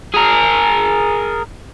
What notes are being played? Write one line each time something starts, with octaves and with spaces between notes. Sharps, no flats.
G#4 A#4